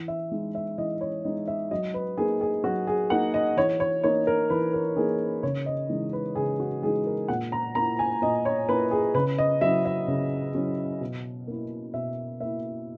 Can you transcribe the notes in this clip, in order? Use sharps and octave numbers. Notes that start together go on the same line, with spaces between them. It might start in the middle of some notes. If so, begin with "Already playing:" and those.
Already playing: E3
E5
G#3 D#4
E5
E3 D#5
C#5
G#3 D#4 D#5
E5
F#3 D#5
B4
A#3 D#4 G#4
G#4
F#3 F#4
G#4
A#3 D#4 F#5
D#5
E3 C#5
C#5
A#3 D#4 C#5
A#4
E3 B4
A#4
A#3 D#4 G#4
C#3 C#5
D#5
E3 G#3 D#4
B4
C#3 G#4
F#4
E3 G#3 D#4 G#4
A#4
A#2 F#5
A#5
A#3 E4 A#5
G#5
A#2 D#5
C#5
A#3 E4 B4
G#4
C#3 B4
D#5
F#3 C#4 E4 E5
E5
C#3
F#3 C#4 E4
B2
A#3 E4
B2 E5
A#3 E4 E5